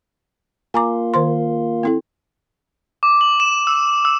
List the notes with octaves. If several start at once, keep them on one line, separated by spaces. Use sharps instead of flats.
A#3 F4 G#5 A#5 D6
D#3 C5 C6
C4 E4 A4
D6
F#7
E7
E6
E6